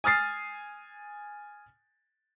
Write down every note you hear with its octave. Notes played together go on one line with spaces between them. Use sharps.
G#5 D#6 F6 A6 C7